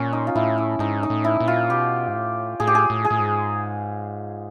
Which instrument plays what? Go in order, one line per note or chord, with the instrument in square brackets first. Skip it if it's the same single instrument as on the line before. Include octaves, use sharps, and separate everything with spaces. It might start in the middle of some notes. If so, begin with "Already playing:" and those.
Already playing: [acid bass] A#2 [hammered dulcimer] C#4
[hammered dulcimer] D#4
F4
[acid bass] A2 [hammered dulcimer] E4
[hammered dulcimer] E4
[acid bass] G#2 [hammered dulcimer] D#4
[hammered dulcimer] D#4
[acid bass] A2
[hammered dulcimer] E4
[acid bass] A#2
[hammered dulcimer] F4
[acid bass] B2 [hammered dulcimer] G4
[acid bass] G#2
A2
[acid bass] A2 [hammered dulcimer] G#4
[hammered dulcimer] G4
G#4
[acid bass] A2
[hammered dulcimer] G#4
[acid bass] A2
G#2